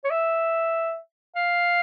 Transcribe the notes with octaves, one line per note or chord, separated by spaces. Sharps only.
C#5
E5
F5